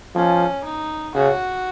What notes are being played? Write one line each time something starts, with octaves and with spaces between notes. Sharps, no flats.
F3 C#4
D#4
C#3 F#4